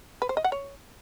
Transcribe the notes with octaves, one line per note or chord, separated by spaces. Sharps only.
B4
C5
D#5
F#5
C#5